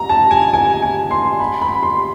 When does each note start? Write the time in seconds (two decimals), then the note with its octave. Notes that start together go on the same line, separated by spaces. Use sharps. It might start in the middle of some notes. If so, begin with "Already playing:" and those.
Already playing: A#5
0.09 A5
0.31 G#5
0.53 G#5
0.82 G#5
1.11 C6
1.40 B5
1.62 B5
1.83 C6